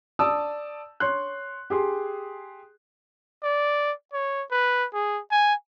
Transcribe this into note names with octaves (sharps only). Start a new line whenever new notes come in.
D5 A5 D#6 E6
C#5 C6 F#6
G4 G#4 C6
D5
C#5
B4
G#4
G#5